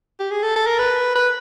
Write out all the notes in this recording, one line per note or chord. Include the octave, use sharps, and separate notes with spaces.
G4
G#4
A4
A4
A#4
B4
B4